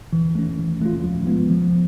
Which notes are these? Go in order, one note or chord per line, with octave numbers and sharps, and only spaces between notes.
E3
A3 C#4
E3
A3 C#4 F4
F3
G#3 B3
F3